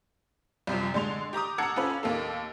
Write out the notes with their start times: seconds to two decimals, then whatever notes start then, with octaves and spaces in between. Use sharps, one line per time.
0.67 C2 F#2 C3 F3
0.94 D3 G#3 C6 F7
1.33 G4 A#5 D6 D#6
1.58 F#5 A5 A#5 E6 G#6 C#7
1.76 C#4 F4 A4 B4
2.03 D#2 A#3 A4